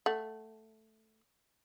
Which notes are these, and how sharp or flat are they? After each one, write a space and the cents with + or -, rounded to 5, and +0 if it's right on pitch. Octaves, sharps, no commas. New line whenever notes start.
A3 +0 F#5 +0